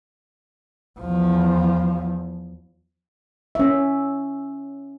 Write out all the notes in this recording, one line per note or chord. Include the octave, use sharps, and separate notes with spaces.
E2 F3
C#4 E5